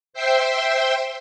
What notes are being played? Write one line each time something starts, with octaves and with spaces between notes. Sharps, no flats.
C5 E5 G5 C6